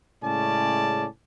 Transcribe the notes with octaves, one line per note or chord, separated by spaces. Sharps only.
A2 C#3 G#3 C#4 D5 A5